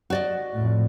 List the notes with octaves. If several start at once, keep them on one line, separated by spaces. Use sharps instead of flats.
F#4 D5 D#5
F2 A2